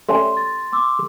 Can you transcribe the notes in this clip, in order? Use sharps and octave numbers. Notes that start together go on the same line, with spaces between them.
G3 A3 C#4 C6
C6 A6
C6 D6 E6